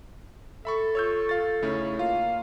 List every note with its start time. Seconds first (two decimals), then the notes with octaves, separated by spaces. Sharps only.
0.65 A4 E5 B5 C#6
0.95 F4 C#5 C#6 E6 G6
1.29 F5 A6
1.62 C#3 A3 C#4 D#4 E4
1.99 A#3 F4 F5